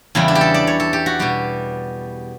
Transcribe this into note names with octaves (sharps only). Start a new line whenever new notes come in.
E2 C#3 G3 E4
D4
G4
A4
D5
C#5
A4
G4
F#4
B2 G3 G4